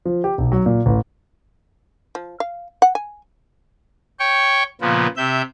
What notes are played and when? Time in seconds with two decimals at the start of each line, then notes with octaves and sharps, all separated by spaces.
0.05 F3
0.24 G4
0.38 B1
0.52 F#3
0.66 A#2
0.86 A1
2.15 F3
2.40 F5
2.82 F#5
2.95 G#5
4.19 C#5 G5 C#6
4.81 A#2 C#3 F3 B3
5.17 C3 E5 G6